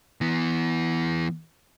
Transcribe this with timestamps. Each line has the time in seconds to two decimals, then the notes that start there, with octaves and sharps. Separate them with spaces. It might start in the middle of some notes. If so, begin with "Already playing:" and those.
0.21 E3 B3